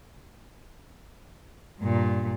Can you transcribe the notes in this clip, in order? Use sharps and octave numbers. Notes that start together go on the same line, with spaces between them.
G2 A#2